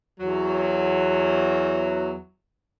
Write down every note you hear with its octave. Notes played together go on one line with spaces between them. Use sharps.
E2 F#3